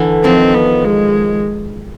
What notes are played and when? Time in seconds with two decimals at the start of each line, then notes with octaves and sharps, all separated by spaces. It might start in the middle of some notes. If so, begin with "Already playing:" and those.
Already playing: D3 E3
0.24 D#3 F3 C4
0.54 B3
0.84 G#3